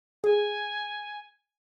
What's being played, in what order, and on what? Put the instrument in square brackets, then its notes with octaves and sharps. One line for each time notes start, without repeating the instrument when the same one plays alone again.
[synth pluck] G#4 [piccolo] G#5